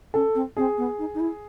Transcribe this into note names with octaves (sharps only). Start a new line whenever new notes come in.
C#4 A4
C4
C4 G#4
B3
D#4
D#4
E4